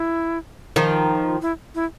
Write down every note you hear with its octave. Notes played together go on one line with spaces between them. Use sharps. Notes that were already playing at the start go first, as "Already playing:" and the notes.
Already playing: E4
D#3 F3
E4
E4